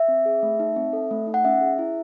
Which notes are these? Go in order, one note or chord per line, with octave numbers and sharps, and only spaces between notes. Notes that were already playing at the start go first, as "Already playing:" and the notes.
Already playing: E5
C4
G#4
A3
D#4
C4
A4
A3
D#4
F#5
C#4 E5
G#4
E4